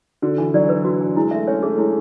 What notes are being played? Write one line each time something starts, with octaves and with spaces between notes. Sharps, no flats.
D3 F#4
E3 G#5
F#3 D5
B4
F#4
G#5
G#3 E4
A3 E5
C#4 C#5
A3 G#4
G#3 E4